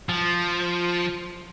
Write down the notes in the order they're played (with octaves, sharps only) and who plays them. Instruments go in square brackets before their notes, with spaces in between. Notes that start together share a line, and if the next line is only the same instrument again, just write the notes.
[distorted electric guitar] F3